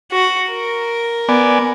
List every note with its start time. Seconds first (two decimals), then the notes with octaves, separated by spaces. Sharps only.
0.11 F#4
0.51 A#4
1.29 B3 D5 G#5